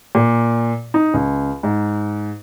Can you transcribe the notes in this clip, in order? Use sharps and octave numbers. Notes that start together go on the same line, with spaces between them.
A#2
D#4
C#2
G#2